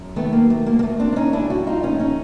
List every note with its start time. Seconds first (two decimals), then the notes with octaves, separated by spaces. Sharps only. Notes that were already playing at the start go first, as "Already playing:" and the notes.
Already playing: F#2
0.16 D#3 A3 B3
0.33 A#3
0.41 F#3
0.50 A3
0.66 D2 A#3
0.79 A#3
0.83 A3
0.91 D2
0.99 C4 D4
1.12 D4
1.16 D3 C#4 D#4
1.33 D4 E4
1.41 G3
1.50 E4 F#4
1.66 F2 D#4 F4
1.83 C#4 D#4
1.91 A3
2.00 C#4 D#4